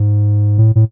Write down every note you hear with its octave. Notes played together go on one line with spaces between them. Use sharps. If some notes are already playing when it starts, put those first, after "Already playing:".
Already playing: G#2
A2
A2